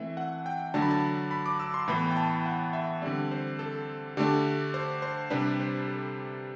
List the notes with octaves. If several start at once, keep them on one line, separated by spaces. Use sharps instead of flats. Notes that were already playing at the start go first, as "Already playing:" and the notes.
Already playing: E3 A3 C4 E5
F#5
G5
D3 F#3 A3 D4 A5
B5
A5
B5
D6
E6
C6
A2 E3 B3 B5
G5
A5
F#5
E5
D3 G3 C4 D5
C5
A4
D3 A3 D4 G4
C5
C5
C3 G3 D4 B4
C5
A4